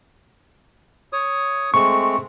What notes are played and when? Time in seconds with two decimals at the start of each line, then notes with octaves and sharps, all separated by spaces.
1.13 C#5 D#6
1.74 G#3 A3 C4 C#6